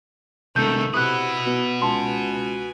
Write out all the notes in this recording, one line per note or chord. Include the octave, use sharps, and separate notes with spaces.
E1 C2 D#3 A3 G6
C3 E4 F#4 B4 D#6 F#6
B2
C#2 G#5 A5 C6